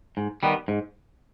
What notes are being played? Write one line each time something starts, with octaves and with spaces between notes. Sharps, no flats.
G#2
D#3 G3 B3
G#2